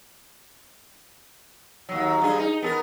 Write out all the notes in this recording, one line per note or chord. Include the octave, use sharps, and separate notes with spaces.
D#2 F#3
G2 G#4
D#4
B3 G#4 A#4